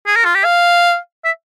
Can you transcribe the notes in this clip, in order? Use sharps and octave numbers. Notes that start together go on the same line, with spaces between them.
G#4
A#4
F4
G4
F5
E5